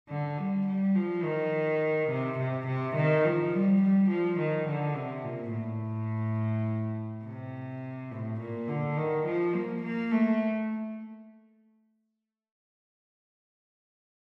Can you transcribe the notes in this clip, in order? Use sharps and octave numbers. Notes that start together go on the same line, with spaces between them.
D3
G3
G3
F3
D#3
C3
C3
C3
D#3
F3
G3
G3
F3
D#3
D3
C3
A#2
A2
C3
A2
A#2
D3
D#3
F3
A#3
A#3
A3